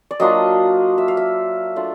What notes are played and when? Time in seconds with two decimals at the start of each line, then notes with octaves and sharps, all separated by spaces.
0.11 D5
0.20 F#3 A#3 D4 F4 D#5
0.98 E5
1.08 F5
1.17 E5
1.76 A3 D4 F4